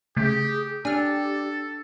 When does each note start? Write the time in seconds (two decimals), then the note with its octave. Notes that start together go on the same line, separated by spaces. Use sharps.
0.16 C#3 A3 G4 G#4
0.85 D4 G4 A4 G#5 F6